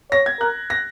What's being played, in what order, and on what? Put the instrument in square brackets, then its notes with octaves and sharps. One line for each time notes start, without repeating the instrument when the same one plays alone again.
[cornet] C#5 [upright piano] A#6
[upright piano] G#6
[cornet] A#4 [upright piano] F#6
[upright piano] A#6